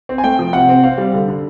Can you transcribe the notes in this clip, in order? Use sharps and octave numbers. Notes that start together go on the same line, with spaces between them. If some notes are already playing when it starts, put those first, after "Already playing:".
C4
G#5
A3 G5
F3
C3 F#5
C4
C4 F5
G3
D3
D3